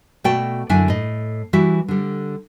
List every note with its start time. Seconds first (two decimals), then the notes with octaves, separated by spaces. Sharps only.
0.24 B2 A3 F#4 D5 G5 A5
0.69 F#2 D3 D4 E4 E5 G#5
0.88 A2 D#5
1.53 E3 G3 E4 F#4 E5
1.88 D3 G3